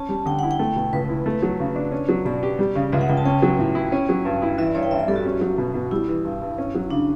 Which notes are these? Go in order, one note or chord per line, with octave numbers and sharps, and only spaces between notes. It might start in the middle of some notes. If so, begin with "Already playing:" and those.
Already playing: C#4 A5
G3
D3 G5
E4 F#5
G5
A3
B2
C#2 B4
E4
A3
F#3
C#3
D4
C#4
F#3
B2 D5
G4
G3
C#3
C#2 E5
F#5
C#2 G5
A5
C#4 G5
F#3
A2
E4
C#4
F#3
G2
E4
E3 E5
D5
G2 C#5
G5
A1 E5
D5
G3 A4
F#4
C#4
F#3
B2
B2
G3 E4
E3
G2
G2
C#4
F#3
C#3 D4